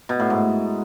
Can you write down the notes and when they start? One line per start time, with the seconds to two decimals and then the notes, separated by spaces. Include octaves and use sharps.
0.09 B2
0.20 A2
0.30 G#2